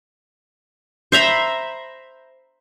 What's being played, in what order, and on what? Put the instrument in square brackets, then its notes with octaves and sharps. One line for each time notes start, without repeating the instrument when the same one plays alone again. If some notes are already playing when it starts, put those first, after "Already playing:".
[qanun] C5 E5 A#5 B5